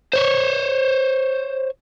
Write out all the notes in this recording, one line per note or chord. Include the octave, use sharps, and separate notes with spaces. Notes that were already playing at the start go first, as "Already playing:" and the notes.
C5 C#5